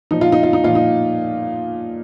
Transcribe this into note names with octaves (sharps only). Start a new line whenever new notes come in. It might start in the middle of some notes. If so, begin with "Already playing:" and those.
A#2 F3 D#4
F4
D#4
F4
D#4
A#2 F3 F4
D#4